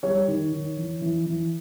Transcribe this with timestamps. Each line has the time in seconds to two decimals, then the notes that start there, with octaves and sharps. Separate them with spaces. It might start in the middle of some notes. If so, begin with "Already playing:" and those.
0.03 G3 C#5
0.28 D#3
0.52 D#3
0.77 E3
1.02 E3
1.26 E3